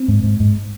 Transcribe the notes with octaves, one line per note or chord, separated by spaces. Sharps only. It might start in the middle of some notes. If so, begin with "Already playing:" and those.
Already playing: C4
G#2
G#2
G#2